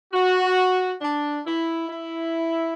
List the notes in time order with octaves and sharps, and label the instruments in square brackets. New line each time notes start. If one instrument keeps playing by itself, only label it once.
[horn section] F#4
D4
E4
E4